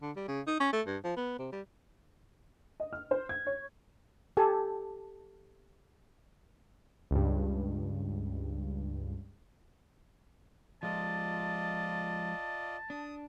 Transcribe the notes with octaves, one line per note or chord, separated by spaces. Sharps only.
D3
G3
C#3
D#4
C#4
A3
G2
F3
B3
C3
G3
D#5
F6
C5
G#6
C#5
G4 A4 G#5 A5
C#2 G2
F3 G#3 F4 D5 D#5 A5
D4 D#6